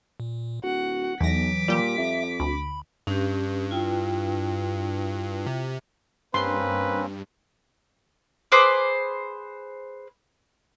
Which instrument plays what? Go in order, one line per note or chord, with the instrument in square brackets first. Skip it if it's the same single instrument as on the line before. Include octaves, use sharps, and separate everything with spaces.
[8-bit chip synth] A#2
[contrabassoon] D1 [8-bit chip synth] F#4 [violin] F#5
[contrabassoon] B1 [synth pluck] E2 A#6 [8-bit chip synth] E3 F#3 [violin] D6 B6
[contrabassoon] A#2 [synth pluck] G3 G4
[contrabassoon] F2 [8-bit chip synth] E5
[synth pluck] D2 [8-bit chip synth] B5
[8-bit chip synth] G2 [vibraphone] C#4 G4
[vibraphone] E4 F4 G5
[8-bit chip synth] C3
[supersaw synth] G2 [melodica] A#3 C4 C#4 [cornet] B4 [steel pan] C6
[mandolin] G#4 B4 C5 D6